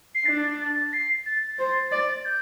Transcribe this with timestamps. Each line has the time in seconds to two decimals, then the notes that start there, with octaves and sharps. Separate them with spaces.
0.15 C7
0.26 D4 A6
0.60 A6
0.88 A6
0.93 C7
1.26 A6
1.42 A6
1.59 C5
1.92 D5
2.21 A6
2.25 G6